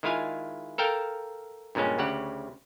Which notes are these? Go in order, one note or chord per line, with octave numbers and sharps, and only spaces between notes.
D#3 G#3 E4 F4 F5 G#5
A4 A#4 F5 G5 A5
G2 A#2 C#3 G#3 C#4
D2 C#3 G4 F#5